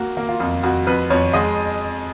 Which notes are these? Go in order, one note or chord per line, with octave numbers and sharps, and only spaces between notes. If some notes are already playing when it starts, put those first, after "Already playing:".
Already playing: A#3 F#4
A#3
F4
F2
F2 F#4
F2 B4
F2 C#5
G#3 D#5